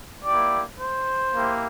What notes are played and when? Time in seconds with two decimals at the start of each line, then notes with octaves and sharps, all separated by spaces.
0.25 A#3 E4 G4 D5
0.79 C5
1.33 A#3 E4 G4